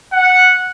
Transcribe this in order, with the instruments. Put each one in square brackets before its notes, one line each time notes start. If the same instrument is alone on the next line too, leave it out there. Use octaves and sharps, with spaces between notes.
[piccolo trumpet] F#5